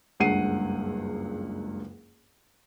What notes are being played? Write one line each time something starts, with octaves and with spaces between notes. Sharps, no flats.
F#1 C#2 G2 F#5 C7 D#7